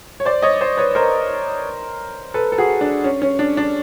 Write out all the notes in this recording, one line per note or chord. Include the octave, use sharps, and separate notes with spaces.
C#5
C5 D5
C#5 D#5
C5 D5
B4 C#5
A#4 C5
A4 B4
A4
F#4 G#4
D4
C#4
C#4
D4
D4